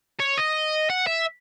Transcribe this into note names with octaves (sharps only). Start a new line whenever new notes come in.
C#5
D#5
F#5
E5